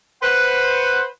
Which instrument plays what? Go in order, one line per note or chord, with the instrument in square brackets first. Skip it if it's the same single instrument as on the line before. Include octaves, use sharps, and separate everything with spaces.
[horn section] B4 C5 F#5